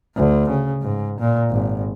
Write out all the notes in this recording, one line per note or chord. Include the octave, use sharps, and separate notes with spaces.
D2
C#3
G#2
A#2
G#1